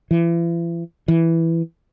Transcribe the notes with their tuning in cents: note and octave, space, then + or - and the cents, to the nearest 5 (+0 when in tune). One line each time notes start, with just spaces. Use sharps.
E3 +40
E3 +5